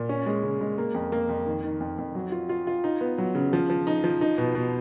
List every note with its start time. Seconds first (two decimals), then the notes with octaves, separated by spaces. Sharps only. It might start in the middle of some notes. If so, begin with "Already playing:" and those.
Already playing: A#2
0.09 C#4
0.26 G#3
0.43 C#3
0.61 G#3
0.78 A#3
0.94 F2
1.12 A#3
1.29 F2
1.46 D#3
1.64 D#3
1.80 F2
1.98 F2
2.15 F#3
2.32 F4
2.49 F4
2.67 F4
2.84 D#4
3.01 B3
3.18 F#3
3.35 C#3
3.53 F3
3.70 F3
3.87 D#4
4.04 F3
4.21 D#4
4.38 B2
4.55 B2